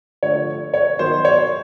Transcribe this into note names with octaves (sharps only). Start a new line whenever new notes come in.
D3 F3 A3 C#5
C#5
D#3 F#3 B3 C5
C#5